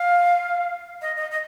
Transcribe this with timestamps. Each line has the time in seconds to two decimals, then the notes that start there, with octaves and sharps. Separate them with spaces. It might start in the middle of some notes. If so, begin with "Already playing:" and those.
Already playing: F5
1.01 D#5
1.16 D#5
1.31 D#5